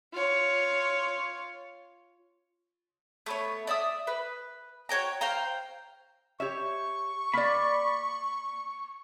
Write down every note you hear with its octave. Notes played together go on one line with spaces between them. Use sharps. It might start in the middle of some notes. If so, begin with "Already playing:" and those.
F4 C#5
A3 B3 C#5
D5 E5 D#6
B4
F#4 C#5 G5 A#5
C5 F5 G5 A#5
G4 C#5 E5 C#6
A#3 D5 B5